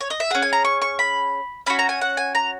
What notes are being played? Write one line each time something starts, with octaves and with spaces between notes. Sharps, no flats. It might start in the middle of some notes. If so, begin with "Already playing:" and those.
C#5
D#5
E5
C#4 G#4 F#5
G#5
A#5
C#6
C#6
B5
C#4 F#4 B5
A#5
G#5
F#5
G#5
A#5